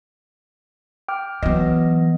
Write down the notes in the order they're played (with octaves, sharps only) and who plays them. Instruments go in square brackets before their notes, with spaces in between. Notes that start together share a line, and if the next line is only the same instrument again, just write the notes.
[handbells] G5 D6 F6
[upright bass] E3 F#3 [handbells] B3 D#5